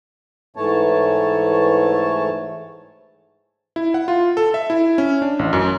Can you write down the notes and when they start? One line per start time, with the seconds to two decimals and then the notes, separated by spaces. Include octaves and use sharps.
0.56 G#2 E3 A3 C#5 A5
3.76 E4
3.94 F#5
4.08 F4
4.37 A4
4.54 E5
4.70 E4
4.98 C#4
5.22 D4
5.39 A1
5.53 F#2